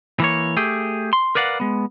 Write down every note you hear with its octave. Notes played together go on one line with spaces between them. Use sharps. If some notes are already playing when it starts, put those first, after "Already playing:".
E3 A#3 C#5
A3 G4 G#4
C6
A#4 B4 D5 F5 F#5
G#3 B3